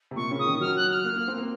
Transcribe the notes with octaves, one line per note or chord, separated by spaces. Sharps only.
C3
A#2 C#6
C#3
D#6
D#3
F#3 F6
F#6
F6
A#3
A#3
C4
A#3